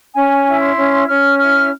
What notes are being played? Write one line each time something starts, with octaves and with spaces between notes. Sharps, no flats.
C#4 G#5
E4
C6
C#4
C#4 F6
E4 F6